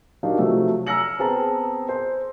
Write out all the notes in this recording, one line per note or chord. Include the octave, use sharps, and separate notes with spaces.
F#3 D4 D#4 G4 A#4 F5
C3 F3 F#3 A3
A#5 E6 F6 A#6 C#7 F#7
B3 C4 G#4 A5 A#5
C5